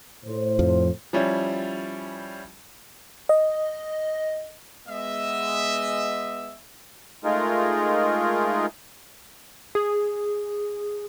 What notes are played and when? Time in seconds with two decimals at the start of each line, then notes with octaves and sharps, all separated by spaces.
0.24 A2 C5
0.59 F2 F3
1.13 F3 G3 C#4 E4
3.29 D#5
4.88 G#3 B3 D#5 E5
7.24 G#3 A3 D#4 F4 G#4 A#4
9.75 G#4